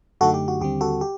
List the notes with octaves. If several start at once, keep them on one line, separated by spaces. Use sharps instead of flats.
F#2 D3 A3 D#4 F#4 A4
G4
F#4
D#2 D3 G3 C4 G4
F#4 A4
G4